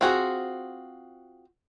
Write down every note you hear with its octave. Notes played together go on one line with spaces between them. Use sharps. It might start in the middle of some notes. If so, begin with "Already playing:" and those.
C4 F4 F#4 G#4